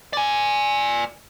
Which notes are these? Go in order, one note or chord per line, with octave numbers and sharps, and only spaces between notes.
D5 G#5